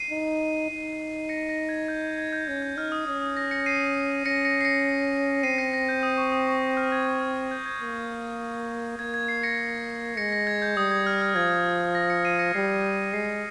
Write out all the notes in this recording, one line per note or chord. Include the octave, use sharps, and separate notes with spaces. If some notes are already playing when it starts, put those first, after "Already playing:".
Already playing: C7 D#7
D#4
D#4
A#6 C#7
A#6
G#6
G6
G#6
G#6
G6
C#4 G6
G6
D#4 F6
D#6
C#4 D#6
D#6
A#6
A#6 C#7
C7 D#7
C#4 A#6 C#7
A#6 C#7
C7
A#6 C#7
C4 C7 D#7
A#6 C#7
A#6
G6
D#6
C#6
D#6
C#6
F6
G#6
G6
F6
G6
G#6
A#3 G6
A#3 G#6
G#6
C7
A#6 C#7
G#3 A#6 C#7
A#6
G#6
G6
G3 D#6
G#6
F6
F6
F3 G#6
A#6
A#6 C#7
C7 D#7
A#6 C#7
G3 C7
G#3 C7